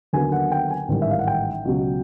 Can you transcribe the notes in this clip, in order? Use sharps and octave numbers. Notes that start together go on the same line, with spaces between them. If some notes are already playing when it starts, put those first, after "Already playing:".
D#2 D3 F#3 B3 G#5
F#5
G5
G#5
A1 G#2 D#3 G3
E5
F5
F#5
G5
C#2 B2 F#3